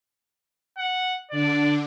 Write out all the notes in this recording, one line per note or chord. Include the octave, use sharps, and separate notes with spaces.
F#5
D3 D4 D5